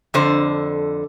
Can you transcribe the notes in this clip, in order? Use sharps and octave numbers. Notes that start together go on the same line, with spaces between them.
F2 D3 C5